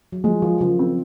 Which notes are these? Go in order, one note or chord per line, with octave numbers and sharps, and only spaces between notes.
F#3
F3 G#3
D#3 F3
C#3 F3
C4